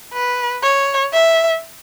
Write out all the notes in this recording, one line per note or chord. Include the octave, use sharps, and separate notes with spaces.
B4
C#5
E5